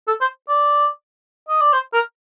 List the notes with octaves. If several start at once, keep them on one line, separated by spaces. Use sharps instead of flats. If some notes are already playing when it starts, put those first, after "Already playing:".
A4
C5
D5
D#5
D5
C5
A#4